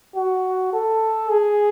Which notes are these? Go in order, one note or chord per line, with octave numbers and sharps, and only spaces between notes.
F#4
A4
G#4